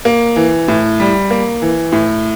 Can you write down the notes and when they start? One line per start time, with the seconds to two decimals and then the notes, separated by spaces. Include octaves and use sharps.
0.05 A#3
0.36 E3
0.68 A2
1.00 G3
1.31 A#3
1.62 E3
1.92 A2